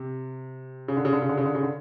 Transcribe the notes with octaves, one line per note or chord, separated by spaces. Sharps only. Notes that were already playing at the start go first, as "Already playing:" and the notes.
Already playing: C3
C#3
D3
C#3
D3
C#3
D3
C#3
D3
C#3
D3